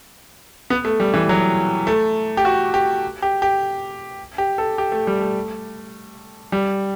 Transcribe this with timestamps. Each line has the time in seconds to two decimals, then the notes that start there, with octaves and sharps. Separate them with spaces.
0.70 B3
0.85 A3
1.00 G3
1.14 E3
1.29 F#3
1.87 A3
2.37 G4
2.45 F#4
2.74 G4
3.22 G4
3.42 G4
4.38 G4
4.58 A4
4.78 G4
4.92 A3
5.07 G3
5.21 A3
6.52 G3